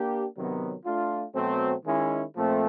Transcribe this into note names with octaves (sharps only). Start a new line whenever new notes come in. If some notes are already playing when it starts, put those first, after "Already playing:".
Already playing: A#3 D4 G4
C3 D#3 F#3 B3
A3 D4 F4
B2 F#3 A3 C4
D#3 G#3 C#4 E4
A#2 F3 A3 C4